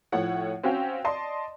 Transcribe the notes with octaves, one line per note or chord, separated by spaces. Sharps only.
A2 F3 A3 C#5 F#5
C4 C#4 F#4 F5 G5
D5 D#5 A5 C6